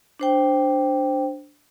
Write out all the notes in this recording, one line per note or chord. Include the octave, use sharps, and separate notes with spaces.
D4 C5 G5